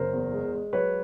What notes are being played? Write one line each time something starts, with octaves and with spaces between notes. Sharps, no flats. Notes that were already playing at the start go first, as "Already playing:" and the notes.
Already playing: F#1 A#4 C5
E2
G#3
G#3
F#3 B4 C#5